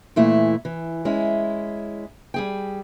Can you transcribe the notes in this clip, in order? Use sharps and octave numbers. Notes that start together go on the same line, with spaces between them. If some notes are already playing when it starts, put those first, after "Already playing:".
A#2 E3 A3 E4
E3
G#3 C#4 E4
G3 G#4 G5